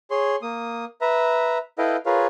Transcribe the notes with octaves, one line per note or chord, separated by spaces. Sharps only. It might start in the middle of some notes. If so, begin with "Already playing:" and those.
G#4 C#5 C6
A#3 D#6
B4 E5 A#5
E4 A4 B4 D#5 F5 G5
F4 G#4 A#4 B4 C#5 F5